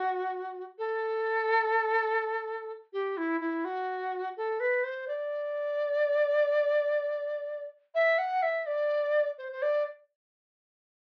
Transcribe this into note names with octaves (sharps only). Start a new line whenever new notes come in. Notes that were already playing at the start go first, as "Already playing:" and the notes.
Already playing: F#4
A4
G4
E4
E4
F#4
A4
B4
C5
D5
E5
F#5
E5
D5
C5
C5
D5